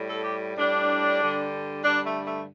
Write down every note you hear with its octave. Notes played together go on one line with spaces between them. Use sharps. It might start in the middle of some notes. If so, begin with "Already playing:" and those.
Already playing: A2 G3
A4
G4
A2 G3 D4
G2 D3 G3
G2 D3 G3 D4
A3
A3